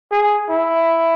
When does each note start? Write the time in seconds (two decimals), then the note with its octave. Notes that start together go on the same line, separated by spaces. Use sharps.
0.11 G#4
0.50 E4